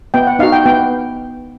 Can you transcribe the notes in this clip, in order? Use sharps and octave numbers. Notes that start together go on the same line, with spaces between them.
B3 G5
F#5
D#4 F#4 F5
G5
B3 G5